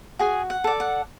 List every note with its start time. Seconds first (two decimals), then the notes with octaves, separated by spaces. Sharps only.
0.19 F#4 G#4 G#5
0.50 F#5
0.64 A4 D5
0.80 F#5